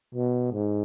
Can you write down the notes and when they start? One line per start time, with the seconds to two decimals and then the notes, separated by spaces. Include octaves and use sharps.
0.15 B2
0.53 G#2